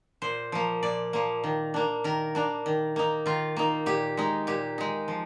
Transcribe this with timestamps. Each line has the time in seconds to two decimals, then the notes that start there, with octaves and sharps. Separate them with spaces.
0.22 A#2 C5
0.52 F3 A#3
0.83 A#2 D5
1.13 F3 A#3
1.44 D#3
1.74 A#3 D4
2.04 D#3 A#4
2.35 A#3 D4
2.66 D#3
2.96 A#3 D#4
3.26 D#3 F4
3.56 A#3 D#4
3.86 A#2 G4
4.17 G#3 D#4
4.47 A#2 G4
4.78 G#3 D#4
5.08 F3